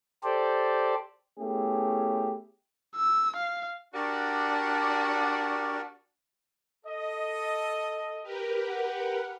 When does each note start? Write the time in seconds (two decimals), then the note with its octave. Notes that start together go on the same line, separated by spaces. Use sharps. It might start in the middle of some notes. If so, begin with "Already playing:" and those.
0.24 G4 A4 C5 D5
1.39 A3 B3 C#4 E4 G4 G#4
2.96 E6
3.37 F5
3.94 D4 F#4 G4 A#4 D5
6.85 A4 D#5
8.23 G4 A#4 B4
8.68 F#5